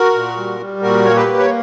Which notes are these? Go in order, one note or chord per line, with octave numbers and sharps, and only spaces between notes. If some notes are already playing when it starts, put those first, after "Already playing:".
Already playing: F#4 A#4
A#2
G3
G3
A#2 F#4 A#4
A#3 C#5
G4 B4
A#3
C#5